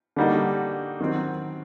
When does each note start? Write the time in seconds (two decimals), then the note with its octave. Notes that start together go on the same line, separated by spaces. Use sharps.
0.16 D3 G3 A#3 D#4 F#4
1.00 D#3 F#3 C4